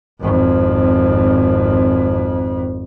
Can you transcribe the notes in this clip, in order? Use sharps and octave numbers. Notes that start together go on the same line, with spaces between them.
G#1 F2